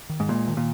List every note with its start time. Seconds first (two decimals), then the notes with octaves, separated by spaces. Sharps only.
0.09 D#3
0.20 G#2
0.29 A#2 G#3
0.48 D#3
0.57 A#2